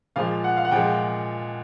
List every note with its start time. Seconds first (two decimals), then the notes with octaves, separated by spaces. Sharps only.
0.16 A#2 F3 G#3 F5
0.44 F#5
0.57 F5
0.65 F#5
0.71 A#2 F3 G#3 G5